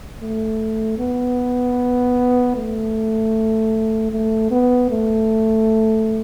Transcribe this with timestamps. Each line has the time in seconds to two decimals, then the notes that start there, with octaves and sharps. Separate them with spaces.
0.20 A3
0.98 B3
2.56 A3
4.12 A3
4.51 B3
4.90 A3